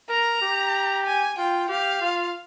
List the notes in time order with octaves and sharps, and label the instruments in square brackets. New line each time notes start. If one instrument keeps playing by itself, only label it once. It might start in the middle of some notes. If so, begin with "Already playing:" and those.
[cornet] A#4 [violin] A#5
[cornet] G4
[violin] G#5
[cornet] F4 [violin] G5
[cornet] G4 [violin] F5
[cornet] F4